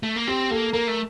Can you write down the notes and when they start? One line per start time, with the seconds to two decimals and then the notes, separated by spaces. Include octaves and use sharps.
0.03 A3
0.16 A#3
0.27 C4 G4
0.50 A#3 A4
0.73 A#3 A#4
0.88 A3